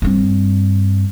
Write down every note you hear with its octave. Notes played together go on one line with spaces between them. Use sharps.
G2 C4